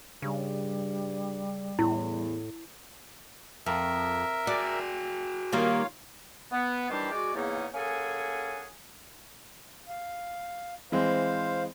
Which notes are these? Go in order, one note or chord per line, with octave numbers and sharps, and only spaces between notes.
G2 C#3 G3
E2 A2 E4
F2 A#4 E5
F#4 G#4 D5
D#3 G3 A#3 F4 C#5 F5
B3
D#3 E3 G3 D4 G4 C5
G#3 F#4 D5
E2 C#3 A#3 B3 C#4 D#4
A#3 C#4 G#4 A4 F#5 G#5
F5
E3 G#3 C4 C5 F5